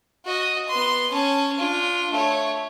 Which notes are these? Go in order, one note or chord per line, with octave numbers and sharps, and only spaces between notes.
F#4 D#5
B3 C6
C#4 A5
D4 F4
A3 C#5